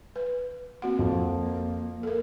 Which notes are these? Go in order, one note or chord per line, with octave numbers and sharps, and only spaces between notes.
B4
A#3 C4 F#4 F#5
F2 F3
A4 A#4